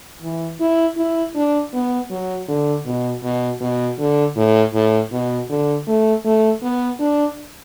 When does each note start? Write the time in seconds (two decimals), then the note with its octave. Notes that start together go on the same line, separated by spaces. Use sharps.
0.22 E3
0.60 E4
0.97 E4
1.35 D4
1.73 B3
2.10 F#3
2.48 D3
2.86 B2
3.23 B2
3.61 B2
3.98 D3
4.36 A2
4.73 A2
5.12 B2
5.49 D3
5.87 A3
6.25 A3
6.63 B3
6.99 D4